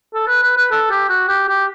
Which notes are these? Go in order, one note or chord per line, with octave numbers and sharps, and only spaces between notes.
A4
B4
B4
B4
A4
G4
F#4
G4
G4